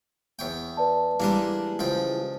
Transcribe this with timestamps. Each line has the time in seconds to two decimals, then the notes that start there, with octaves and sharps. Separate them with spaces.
0.39 E2 C#5 G5
0.77 B4 D5 A5
1.20 E3 G3 G#3 A#3 D4 A#4
1.79 C#2 F3 G5